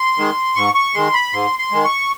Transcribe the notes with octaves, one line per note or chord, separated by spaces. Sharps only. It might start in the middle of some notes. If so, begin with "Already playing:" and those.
Already playing: C6
D#3 G#3
G#2 C#6
C#6
D#3 G#3 C6
B5
G#2 C6
C6
D#3 G#3
C#6